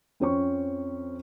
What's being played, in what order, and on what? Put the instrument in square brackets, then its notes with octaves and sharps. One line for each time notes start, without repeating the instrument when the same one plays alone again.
[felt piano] F2 C4 C#4 C#6